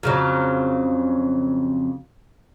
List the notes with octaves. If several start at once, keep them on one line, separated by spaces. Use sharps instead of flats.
F2 C#3 F#3